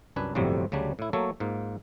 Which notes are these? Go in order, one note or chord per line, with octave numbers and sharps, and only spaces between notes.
C2 F#2 D4 B4 G#5
G1 F2 A2 C3 F#3 G3
D2 C#3 F#3 G3 D4
A2 E4
F#3 A3 A#3 A4 C#5
G#2 A#3 F4